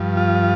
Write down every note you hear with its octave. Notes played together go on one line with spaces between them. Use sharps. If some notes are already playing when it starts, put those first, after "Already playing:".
Already playing: G2 F3
F4